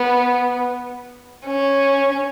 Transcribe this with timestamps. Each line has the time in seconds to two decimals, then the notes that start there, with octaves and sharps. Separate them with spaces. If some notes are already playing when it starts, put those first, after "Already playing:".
Already playing: B3
1.46 C#4